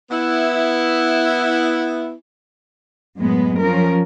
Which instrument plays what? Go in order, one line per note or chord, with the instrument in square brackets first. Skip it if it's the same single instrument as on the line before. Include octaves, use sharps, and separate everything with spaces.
[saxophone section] B3 E4
[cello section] F#2 A2 G#3 B3
F3 C#4 A#4